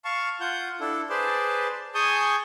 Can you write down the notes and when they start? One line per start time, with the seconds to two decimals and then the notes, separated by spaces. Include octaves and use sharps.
0.05 F5 A5 C#6
0.40 F4 F#5 G6
0.80 D4 E4 A4
1.10 G#4 B4 C5 D5 A5
1.95 G#4 G#5 A5 C#6 D#6 G6